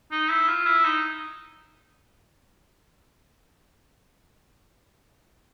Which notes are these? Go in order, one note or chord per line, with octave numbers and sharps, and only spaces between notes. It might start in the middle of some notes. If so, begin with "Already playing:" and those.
D#4
E4
F4
E4
D#4